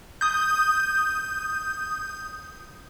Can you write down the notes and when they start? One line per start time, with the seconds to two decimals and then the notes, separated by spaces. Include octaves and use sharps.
0.21 D#6 G6